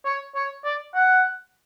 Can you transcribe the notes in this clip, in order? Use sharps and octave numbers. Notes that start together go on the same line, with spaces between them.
C#5
C#5
D5
F#5